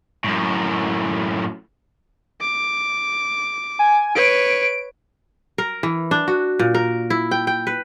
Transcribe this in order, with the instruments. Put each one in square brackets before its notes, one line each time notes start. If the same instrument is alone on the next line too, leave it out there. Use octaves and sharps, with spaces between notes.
[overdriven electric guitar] F#2 A2
[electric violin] D6
[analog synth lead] G#5
[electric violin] B4 C#5 [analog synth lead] D7
[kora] A#4
E3
D4
F#4
A#2
A#4
E4
G5
G5
B4